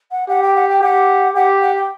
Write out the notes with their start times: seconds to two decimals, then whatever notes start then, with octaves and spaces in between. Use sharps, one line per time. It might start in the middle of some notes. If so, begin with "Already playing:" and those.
0.11 F#5
0.28 G4 F#5
0.42 G5
0.55 F#5
0.69 G5
0.81 G4 F#5
1.35 G4 F#5
1.61 F#5
1.75 G5